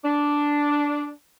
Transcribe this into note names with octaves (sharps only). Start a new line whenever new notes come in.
D4